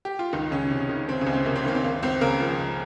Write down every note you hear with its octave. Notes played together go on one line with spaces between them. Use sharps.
G4
F4
C#2 D#3 D#4
C#2 C#3 C#4
C3
D#3
C#2 C4
C#3 C#4
C#2
C4
C3 A#3
C4
D#3 A#3
C4
C#2 A#3
C#2 C4
C#3 A#3 A#4
F3
C#2